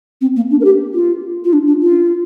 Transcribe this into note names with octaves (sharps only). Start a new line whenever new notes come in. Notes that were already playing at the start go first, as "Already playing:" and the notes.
C4
A#3
D4
A#4
G4
F4
F4
D4
D4
F4